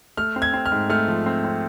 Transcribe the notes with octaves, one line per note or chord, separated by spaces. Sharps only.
A3 F6
C4
G#6
C4
F6
G#2
A3 F6
F3
C4
C4